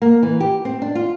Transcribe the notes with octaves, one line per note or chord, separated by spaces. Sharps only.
A#3
E3
G4
C4
D4
F4